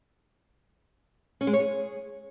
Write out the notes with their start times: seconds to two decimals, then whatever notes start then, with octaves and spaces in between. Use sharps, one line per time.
1.41 C#4
1.47 G#3
1.53 C#5
1.60 G#4